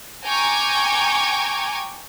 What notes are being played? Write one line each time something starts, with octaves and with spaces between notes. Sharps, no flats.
G5 G#5 A#5 C#6 D6 G#6